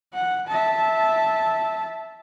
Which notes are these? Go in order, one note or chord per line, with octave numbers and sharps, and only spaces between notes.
F#5
E5 A5